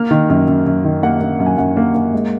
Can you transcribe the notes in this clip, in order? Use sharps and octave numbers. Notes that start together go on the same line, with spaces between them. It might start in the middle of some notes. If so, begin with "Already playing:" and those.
Already playing: A#3 F6
D#3
F#2
F#2
F#2
D#3
A#3 F#5
A#3
F#2
G#5
F#2 F#5
A#3
A#3
G#3